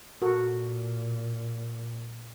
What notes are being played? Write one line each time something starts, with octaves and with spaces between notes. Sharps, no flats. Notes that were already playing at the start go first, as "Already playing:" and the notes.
A#2 F#4 A4 A#4